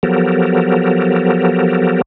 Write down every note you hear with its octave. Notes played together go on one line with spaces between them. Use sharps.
F3 F#3 B3 G4 A4 A#4